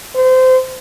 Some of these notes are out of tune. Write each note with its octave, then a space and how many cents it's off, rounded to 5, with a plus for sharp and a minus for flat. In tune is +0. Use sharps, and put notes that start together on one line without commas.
C5 -25